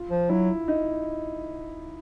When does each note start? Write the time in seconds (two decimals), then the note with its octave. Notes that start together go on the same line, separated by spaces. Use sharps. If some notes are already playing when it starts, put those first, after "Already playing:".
Already playing: F4
0.10 F3
0.29 F#3 E4
0.68 D#4